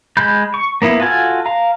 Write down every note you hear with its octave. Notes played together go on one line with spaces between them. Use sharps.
G#3 B5 G6
C#6
A#3 B3 E4
F4 F#4 A4 G#5 F6
F5 A#5